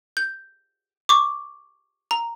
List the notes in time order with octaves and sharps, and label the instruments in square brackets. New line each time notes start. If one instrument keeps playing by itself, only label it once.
[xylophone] G6
C#6 D6
A#5